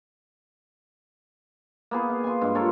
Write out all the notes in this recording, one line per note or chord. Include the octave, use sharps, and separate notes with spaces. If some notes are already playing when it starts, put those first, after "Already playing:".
A#3 B3 G#4
F5
G#5 C6
G2 G#3
F4 A4 A#4 C#5